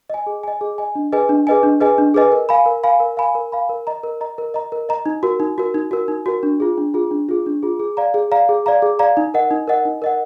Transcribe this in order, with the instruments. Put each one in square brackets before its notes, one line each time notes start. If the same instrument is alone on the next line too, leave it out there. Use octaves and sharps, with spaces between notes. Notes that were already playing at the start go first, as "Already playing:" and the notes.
[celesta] D#5 G#5
G#4
D#5 G#5
G#4
D#5 G#5
D4
G#4 B4 D#5 G#5
D4
G#4 B4 D#5 G#5
D4
G#4 B4 D#5 G#5
D4
G#4 B4 D#5 G#5
A#4
F5 G#5 B5
A#4
F5 G#5 B5
A#4
F5 G#5 B5
A#4
F5 G#5 B5
A#4
D#5 A#5
A#4
D#5 A#5
A#4
D#5 A#5
A#4
D#5 A#5
D#4
F#4 A#4
D#4
F#4 A#4
D#4
F#4 A#4
D#4
F#4 A#4
D4
F4 G#4
D4
F4 G#4
D4
F4 G#4
D4
F4 G#4
G#4
D5 F5 A#5
G#4
D5 F5 A#5
G#4
D5 F5 A#5
G#4
D5 F5 A#5
D#4
A#4 D#5 F#5
D#4
A#4 D#5 F#5
D#4
A#4 D#5 F#5